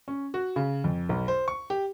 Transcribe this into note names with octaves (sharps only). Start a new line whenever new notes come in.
C#4
F#4
C#3
F2
B1
C5
C#6
G4